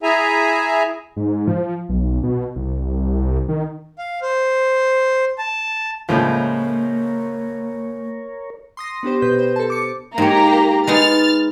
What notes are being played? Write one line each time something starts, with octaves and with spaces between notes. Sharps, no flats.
E4 G#4 E5 G#5 A#5
G#2
F3
B1
B2
C2
D#3
F5
C5
A5
C#2 A2 F3 A#3 A#4 C#5
C6 D#6 A#6
B3 D4 G4 C5
B2 B4 G6
C5
A4 A5
D6 C#7
G#2 A#3 G4 C#5 A#5
G#3 B3 D#4 F6 A6